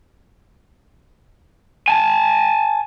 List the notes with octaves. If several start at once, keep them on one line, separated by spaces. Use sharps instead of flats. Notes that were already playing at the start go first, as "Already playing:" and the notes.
G#5 A5